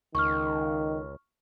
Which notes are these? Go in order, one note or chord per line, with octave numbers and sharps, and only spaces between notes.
C#2 D#3 C#6 F6